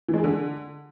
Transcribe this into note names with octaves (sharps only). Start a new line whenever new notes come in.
E3
G#3
G#4
D3